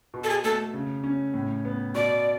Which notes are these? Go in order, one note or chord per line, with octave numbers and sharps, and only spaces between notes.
B2
A4
G#4
A3 A4
C#3
C#4
A2
B3
B2 D5